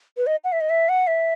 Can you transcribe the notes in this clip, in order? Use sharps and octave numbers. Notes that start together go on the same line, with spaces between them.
B4
D#5
F#5
E5
D#5
E5
F#5
E5